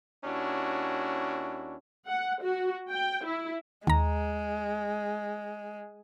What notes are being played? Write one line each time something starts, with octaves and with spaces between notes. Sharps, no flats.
D#2 C#4 D4 E4 F#4
F#5
F#4
G5
E4
D#2 G#3 A#5